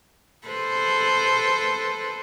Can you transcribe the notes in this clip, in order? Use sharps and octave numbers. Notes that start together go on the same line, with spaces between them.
A4 B4 C5